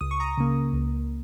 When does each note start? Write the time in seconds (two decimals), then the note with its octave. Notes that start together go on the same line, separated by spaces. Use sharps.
0.01 C#2 D#6
0.11 C#6
0.20 A#5 D#6
0.38 C#3 A#3
0.73 C#2